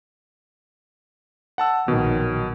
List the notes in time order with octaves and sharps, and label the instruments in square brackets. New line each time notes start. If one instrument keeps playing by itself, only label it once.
[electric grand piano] F#5 A5 E6
[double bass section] A#1 D#3 F#3 [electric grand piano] B2